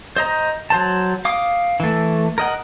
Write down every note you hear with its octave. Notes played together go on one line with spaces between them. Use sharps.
C5 D#5 A#5
F#3 C5 A5
F5 D6 D#6
E3 A3
A#4 D#5 F#5